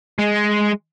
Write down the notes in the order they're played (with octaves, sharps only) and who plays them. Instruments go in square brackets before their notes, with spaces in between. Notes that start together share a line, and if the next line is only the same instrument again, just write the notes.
[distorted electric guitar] G#3